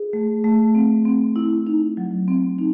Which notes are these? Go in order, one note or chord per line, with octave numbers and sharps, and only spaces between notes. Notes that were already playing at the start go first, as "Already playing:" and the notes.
Already playing: G#4
A3
A3
C4
C4
E4
D#4
F#3
C4
D#4